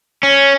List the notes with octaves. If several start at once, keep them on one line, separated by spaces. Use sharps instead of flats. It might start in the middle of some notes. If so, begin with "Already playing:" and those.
C#4